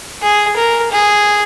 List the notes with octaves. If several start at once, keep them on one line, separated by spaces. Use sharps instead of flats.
G#4
A#4
G#4